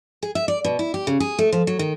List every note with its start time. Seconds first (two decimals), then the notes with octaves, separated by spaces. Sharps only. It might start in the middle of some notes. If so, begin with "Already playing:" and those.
0.23 G#4
0.35 E5
0.48 D5
0.65 B2
0.79 E4
0.94 G4
1.07 C#3
1.20 G#4
1.39 A3
1.52 F3
1.67 F#3
1.79 D#3